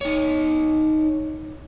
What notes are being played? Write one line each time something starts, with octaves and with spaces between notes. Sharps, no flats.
D#4 C#5